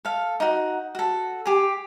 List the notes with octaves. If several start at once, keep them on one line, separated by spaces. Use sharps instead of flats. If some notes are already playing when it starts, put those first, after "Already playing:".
A4 F5
D#4 F#4
F#4 A4
G4 G#4